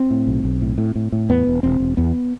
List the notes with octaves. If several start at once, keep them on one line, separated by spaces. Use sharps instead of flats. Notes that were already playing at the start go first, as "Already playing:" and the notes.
Already playing: C4
A2
B1
B1
A2
A2
A2
A2
E2 B3
E1
E1 C4
E1
E2 B3